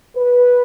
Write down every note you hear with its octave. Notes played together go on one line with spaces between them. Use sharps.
B4